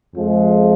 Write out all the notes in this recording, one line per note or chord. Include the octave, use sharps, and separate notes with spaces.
F2 F3 G#3